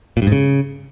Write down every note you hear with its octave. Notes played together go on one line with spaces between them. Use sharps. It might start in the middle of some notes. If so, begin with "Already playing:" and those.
A#2
G2
G#2
C#3